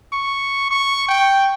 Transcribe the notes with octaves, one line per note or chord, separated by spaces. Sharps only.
C#6
C#6
G5